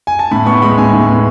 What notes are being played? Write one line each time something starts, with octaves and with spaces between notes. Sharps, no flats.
G#5
A5
A2 B5
B3 C#6
G#3 B5
A2 G#5
A2
B3